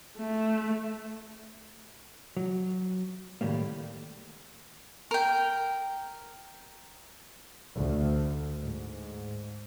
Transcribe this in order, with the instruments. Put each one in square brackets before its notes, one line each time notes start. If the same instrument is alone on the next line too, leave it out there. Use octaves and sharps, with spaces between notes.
[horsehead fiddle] A3
[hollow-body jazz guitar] F#3
A2 D#3 F#3 G3 A#3
[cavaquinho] A#4 G5
[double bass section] D2
G#2